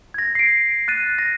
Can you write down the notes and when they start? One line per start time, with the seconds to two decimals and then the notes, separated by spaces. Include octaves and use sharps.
0.14 G#6 A#6
0.35 C7 D7
0.88 F#6 A6 D#7
1.19 A#6